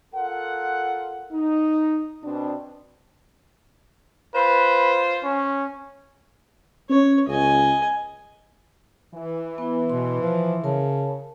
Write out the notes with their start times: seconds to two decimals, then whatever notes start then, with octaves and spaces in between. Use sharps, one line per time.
0.14 F4 A4 A#4 F#5
1.32 D#4
2.24 B2 C4 D4
4.35 F4 B4 C5
5.24 C#4
6.90 C#4 C#5
7.28 C#2 D#5 G#5
9.15 E3
9.58 B3 E4
9.90 B2 C6
10.21 F3
10.64 C#3 A#4 C#5 A5